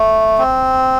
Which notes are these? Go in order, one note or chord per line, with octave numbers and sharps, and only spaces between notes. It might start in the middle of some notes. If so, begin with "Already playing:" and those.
Already playing: A3
C4